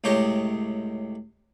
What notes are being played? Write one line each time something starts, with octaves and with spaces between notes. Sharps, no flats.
C#2 A2 C3 G4 C#5 D#5